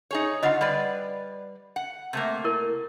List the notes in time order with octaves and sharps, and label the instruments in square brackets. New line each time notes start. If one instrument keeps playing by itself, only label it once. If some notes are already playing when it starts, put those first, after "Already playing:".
[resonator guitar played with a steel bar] D#4 G#4 C#5
[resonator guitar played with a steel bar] D3 F4 [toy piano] D#5 F#5 B5
[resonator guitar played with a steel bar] G3 B4 D5
F#5
C3 A3 A#3
[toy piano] E4 A#4